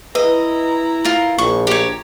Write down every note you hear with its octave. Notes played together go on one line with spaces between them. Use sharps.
E4 B4 D#5 A#5
F4 A#4
A#1 C#6
G4 C#5 A#5